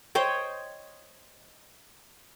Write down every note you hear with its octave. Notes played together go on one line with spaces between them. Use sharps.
C5 C#5 D#5 G5